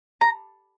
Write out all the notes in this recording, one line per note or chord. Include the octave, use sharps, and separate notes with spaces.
A#5